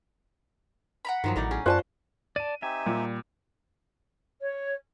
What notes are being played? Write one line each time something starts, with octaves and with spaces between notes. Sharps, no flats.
F#5 A#5 B5
G2 D#3 F3 F#3
A1 A2 D#4 D5
C#4 G#4
F#2 F4 F#4 C5 D5 G#5 A5
D5 A5 D#7
C4 D#4 G4 E5 G#5
A#2 G3
C#5